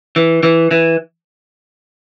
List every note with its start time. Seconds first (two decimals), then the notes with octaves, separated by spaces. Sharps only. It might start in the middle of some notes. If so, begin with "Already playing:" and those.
0.16 E3
0.43 E3
0.71 E3